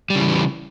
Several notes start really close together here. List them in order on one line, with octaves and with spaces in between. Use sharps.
G3 C#3 E3